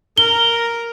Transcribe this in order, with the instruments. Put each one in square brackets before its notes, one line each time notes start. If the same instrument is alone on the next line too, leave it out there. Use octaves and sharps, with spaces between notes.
[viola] A#4 [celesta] G7